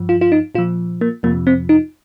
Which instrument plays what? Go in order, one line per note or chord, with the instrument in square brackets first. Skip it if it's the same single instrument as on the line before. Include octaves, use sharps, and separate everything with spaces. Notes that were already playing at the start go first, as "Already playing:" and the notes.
Already playing: [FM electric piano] G2 F3
F4
F4
D#4
A#2 F4
F3
A#3
F2 C3 F3 A#3
C4
D#4